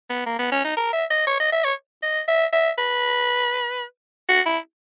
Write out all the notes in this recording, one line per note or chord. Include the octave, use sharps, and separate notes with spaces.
B3
A#3
B3
C#4
D#4
A#4
E5
D#5
C#5
D#5
E5
C#5
D#5
E5
E5
B4
F#4
E4